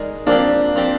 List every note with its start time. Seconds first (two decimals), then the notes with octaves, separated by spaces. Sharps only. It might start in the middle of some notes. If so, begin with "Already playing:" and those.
Already playing: G#3 D#4 A#4 D5
0.27 F3 A#3 C4 D4 G4
0.76 F3 C4 G4